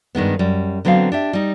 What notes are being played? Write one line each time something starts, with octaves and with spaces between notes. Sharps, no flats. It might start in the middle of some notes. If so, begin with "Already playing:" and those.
G2 D#3 G#3 B3
F#2 G3
D3 F#3 B3 C4 F5
D4 G4 E5
G3 D#4